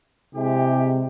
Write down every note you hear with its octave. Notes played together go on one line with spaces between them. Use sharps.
C3 G#3 E4 G4